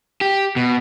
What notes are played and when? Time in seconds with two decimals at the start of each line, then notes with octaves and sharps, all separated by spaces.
0.21 G4
0.56 B2